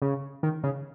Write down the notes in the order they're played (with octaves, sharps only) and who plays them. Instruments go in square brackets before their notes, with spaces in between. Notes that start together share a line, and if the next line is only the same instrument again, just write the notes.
[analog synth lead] C#3
D#3
C#3